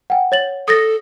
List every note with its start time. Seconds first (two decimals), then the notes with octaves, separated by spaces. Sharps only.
0.10 F#5 G5
0.32 C#5 A6 F#7
0.68 A4 D#6 A6 A#6